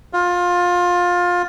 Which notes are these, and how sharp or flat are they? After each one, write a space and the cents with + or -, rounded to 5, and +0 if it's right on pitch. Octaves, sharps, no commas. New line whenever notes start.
F4 +20